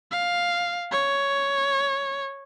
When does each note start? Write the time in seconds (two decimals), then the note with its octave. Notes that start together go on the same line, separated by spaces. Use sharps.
0.12 F5
0.92 C#5